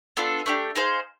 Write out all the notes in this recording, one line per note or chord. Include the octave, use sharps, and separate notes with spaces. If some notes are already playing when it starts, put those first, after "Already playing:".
B3 D4 F4 A4
A3 D4 G4
D#4 G#4 C5 F5